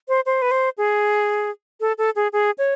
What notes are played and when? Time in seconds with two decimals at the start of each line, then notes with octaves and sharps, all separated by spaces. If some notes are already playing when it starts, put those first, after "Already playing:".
0.08 C5
0.26 C5
0.42 B4
0.51 C5
0.78 G#4
1.81 A4
1.98 A4
2.16 G#4
2.33 G#4
2.58 C#5